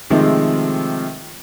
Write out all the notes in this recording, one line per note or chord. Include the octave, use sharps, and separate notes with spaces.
C3 D#3 F3 G#3 A3 C4